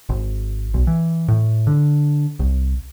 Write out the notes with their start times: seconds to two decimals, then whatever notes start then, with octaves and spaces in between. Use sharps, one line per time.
0.09 G#1
0.74 B1
0.87 E3
1.28 A2
1.67 D3
2.39 C2